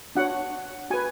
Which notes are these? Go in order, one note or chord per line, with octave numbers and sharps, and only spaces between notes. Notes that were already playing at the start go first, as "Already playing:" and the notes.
D4 F#4 C#5 F#5
F#4 B4 G#5